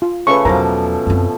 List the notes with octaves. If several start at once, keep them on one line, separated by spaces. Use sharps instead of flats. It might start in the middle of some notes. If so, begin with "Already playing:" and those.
F4
C#3 A3 B4 C#6
E2 B2 F3 F#3 A#4 A#5 D6
F#2 C4